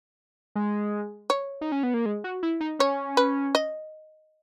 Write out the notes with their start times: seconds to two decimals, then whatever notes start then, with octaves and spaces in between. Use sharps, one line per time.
0.55 G#3
1.30 C#5
1.61 D#4
1.72 C#4
1.83 B3
1.94 A#3
2.06 G#3
2.24 F#4
2.43 E4
2.60 D#4
2.79 C#4 C#5
3.17 B4
3.55 D#5